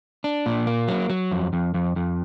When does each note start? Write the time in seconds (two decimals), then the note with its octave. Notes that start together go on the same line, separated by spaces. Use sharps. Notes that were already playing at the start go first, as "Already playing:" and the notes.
0.24 D4
0.46 A#2
0.67 A#3
0.88 F#3
1.10 F#3
1.32 F2
1.53 F2
1.74 F2
1.96 F2